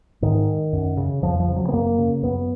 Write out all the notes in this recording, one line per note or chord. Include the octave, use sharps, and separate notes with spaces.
G#2 D#3
F#2
C#3
F2 F3
F3
C#3
F#3
B3
F#2 A#3
C#3
F#2 B3